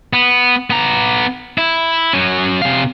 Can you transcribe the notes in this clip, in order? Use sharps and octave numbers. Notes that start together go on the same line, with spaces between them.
B3
B3 A#5
E4
F#3 C#4
C3 F5